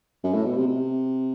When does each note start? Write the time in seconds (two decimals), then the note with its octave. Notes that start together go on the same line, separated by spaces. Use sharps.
0.24 F#2
0.34 A2
0.46 B2
0.56 C3
0.67 C3